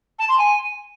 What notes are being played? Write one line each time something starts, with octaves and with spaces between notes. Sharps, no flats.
A5
C6
G#5